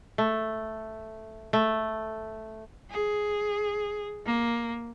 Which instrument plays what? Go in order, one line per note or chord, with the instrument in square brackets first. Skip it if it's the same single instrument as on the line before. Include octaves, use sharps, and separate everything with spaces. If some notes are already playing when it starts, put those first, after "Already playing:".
[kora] A3
A3
[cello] G#4
A#3